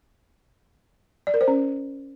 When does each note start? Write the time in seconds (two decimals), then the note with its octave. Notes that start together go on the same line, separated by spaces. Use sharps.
1.27 D5
1.34 A#4
1.41 C5
1.48 C#4